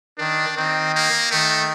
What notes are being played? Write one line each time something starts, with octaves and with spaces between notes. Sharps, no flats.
D#3 D4
D#3 C4
A#3
D#3 A3